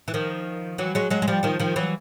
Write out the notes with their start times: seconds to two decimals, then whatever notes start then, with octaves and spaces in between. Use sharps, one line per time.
0.08 E3
0.14 D#3 F3
0.78 E3 F#3
0.95 F#3 G#3
1.10 F#3 G#3
1.22 G#3
1.28 F3 G3
1.43 D#3 F3
1.60 D#3 F3
1.76 E3 F#3